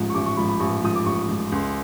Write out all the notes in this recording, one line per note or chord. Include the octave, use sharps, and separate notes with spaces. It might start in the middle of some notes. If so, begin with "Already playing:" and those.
Already playing: A1 G#2 F3
C#6
A1 D6
C#6
G#2 F3 B5
B5
A1 C#6
G#2 F3 D#6
D6
A1 C#6
G#2 F3
C#2 C6